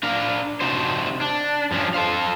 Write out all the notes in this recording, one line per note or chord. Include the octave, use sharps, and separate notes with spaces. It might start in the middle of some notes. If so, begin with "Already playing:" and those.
D4 A#4 F5
C3 D4 D#4 F#4 C5
D4
G2 F3 C#4 D4
A4 C5 F5